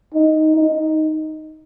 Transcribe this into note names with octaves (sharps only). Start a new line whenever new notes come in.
D#4
D#4